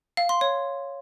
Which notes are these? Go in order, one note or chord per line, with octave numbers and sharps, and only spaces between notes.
F5
C6
C#5